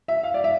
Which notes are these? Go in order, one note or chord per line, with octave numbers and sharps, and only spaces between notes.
E5
F5
D5
E5